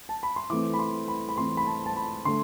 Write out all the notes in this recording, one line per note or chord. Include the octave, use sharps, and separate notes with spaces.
A5
B5
C6
E3 A3 C4 D6
B5
C6
B5
B5
E3 A3 C4 C6
B5
A5
A5
B5
D3 A3 C6